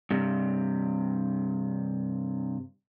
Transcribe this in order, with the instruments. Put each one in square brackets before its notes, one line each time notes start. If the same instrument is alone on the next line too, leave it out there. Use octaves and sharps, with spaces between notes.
[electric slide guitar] G2 C3